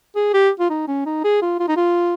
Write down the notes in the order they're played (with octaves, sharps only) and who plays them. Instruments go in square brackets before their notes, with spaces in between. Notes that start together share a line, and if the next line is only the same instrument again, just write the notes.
[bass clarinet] G#4
G4
F4
D#4
C#4
D#4
G#4
F4
F4
D#4
F4